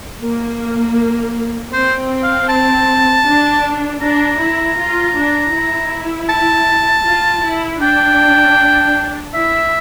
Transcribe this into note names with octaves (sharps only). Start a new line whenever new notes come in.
A#3
C4 C5
F5
A5
D4
D4 A#5
E4
F4
D4
E4
A5
F4
E4
D4 G5
E4 E5